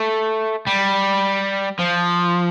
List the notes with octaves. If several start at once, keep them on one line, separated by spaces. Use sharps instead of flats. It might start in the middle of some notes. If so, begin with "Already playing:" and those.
Already playing: A3
G3
F3